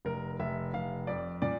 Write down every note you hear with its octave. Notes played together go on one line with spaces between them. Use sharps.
F1 A#4
F1 E5
F1 F5
F2 D5
A#2 D5